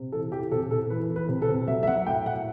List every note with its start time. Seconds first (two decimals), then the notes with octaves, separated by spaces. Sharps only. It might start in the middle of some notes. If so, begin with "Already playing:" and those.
Already playing: C3
0.12 E3 A4
0.32 E3 G4
0.52 C3 A4
0.71 C3 A4
0.90 E3 B4
1.10 E3
1.16 B4
1.29 C3
1.42 A4
1.49 C3
1.68 F#3 E5
1.83 E5
1.87 F#3 F#5
2.07 A2 G5
2.26 A2 F#5